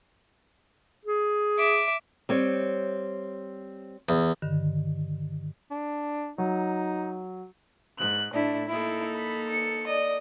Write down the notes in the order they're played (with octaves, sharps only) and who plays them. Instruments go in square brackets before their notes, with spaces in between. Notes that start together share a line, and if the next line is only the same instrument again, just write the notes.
[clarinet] G#4
[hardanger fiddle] E5 D6
[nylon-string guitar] G3 C4 C#5
[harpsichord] E2
[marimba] G2 D3 D#3
[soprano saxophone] D4
[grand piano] F#3 [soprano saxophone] D#4
[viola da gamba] G#2 [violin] F#6
[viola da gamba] A2 A3 E4 [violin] D4
[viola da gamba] A#3 D#4 A4 [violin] E4
[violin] B5
C#7
D5 D#5